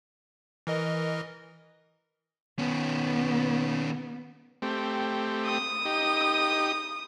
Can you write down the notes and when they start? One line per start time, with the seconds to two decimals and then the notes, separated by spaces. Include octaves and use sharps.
0.67 E3 A#4 D#5
2.59 D#3 B3 C#4
4.62 A3 C4 G4
5.46 D#6
5.85 D#4 G4